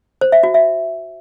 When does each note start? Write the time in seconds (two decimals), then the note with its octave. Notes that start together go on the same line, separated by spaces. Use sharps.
0.21 C5
0.32 E5
0.43 F#4
0.54 E5